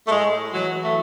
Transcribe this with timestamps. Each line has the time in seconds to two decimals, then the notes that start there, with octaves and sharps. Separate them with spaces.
0.07 A3
0.11 A2 G#3
0.54 E3 F#3
0.84 A3